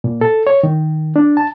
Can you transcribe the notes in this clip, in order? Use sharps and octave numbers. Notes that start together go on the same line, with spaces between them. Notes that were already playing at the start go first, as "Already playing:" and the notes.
A#2
A4
C#5
D#3
D4
A5